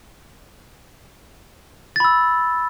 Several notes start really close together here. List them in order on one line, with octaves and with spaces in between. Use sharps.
A6 B5 E6